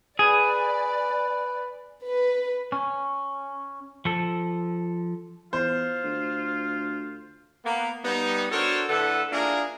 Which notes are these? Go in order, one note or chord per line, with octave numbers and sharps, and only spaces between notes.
G#4 B4 D5
B4
C#4
F3 A4
E2 F4 C5
D2
A#3 B3
G3 B3 D#4
D4 F#4 A4 A#4 C5 C#5
A2 D3 A4 B4 E5 F#5
A#3 D4 E4 F4 G#4 A#4